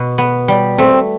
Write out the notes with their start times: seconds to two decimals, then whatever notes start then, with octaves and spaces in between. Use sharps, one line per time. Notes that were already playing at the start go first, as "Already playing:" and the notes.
Already playing: B2
0.18 B3
0.48 G3
0.78 A3 C4